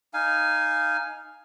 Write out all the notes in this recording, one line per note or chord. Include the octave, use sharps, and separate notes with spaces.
D#4 F5 G#5